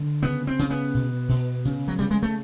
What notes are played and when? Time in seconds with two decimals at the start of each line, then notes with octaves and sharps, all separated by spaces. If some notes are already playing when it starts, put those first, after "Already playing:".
Already playing: D3
0.23 C#3 B3
0.47 C4
0.59 C#3
0.70 B3
0.94 B2
1.29 B2
1.65 C#3
1.88 F#3
1.99 C#3 G3
2.11 G#3
2.23 A3